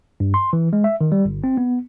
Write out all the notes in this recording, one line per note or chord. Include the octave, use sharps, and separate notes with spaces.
G2
C6
E3
G#3
E5
D#3
G3
G1
C4
B3